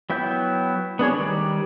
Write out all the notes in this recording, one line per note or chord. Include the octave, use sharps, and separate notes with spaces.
F#3 B3 E4 G5 G6
B3 D4 G#4 C#5
D#3 G3 D5